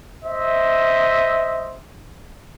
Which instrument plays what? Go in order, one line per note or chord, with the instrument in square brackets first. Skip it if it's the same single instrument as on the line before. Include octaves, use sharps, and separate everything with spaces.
[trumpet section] C5 D#5 E5